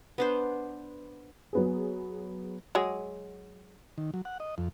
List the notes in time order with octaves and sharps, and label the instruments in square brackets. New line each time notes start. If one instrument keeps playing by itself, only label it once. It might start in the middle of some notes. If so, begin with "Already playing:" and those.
[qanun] B3 D4 C5
[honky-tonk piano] F#3 B3 G#4
[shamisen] F#3 G#3 G#4
[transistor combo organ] D#3
F#3
F#5
D#5
F2